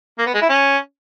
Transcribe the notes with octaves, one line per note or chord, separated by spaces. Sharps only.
A#3
B3
G#3
E4
C#4